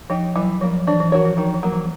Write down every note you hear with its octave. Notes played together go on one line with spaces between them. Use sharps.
F3 D#4 G4
E3 F#3
F3 G3 A#3
E3 D4
E3
E3 F#4 A#4 C#5
F3
D#3 F3
F3
F#3 A#3
E3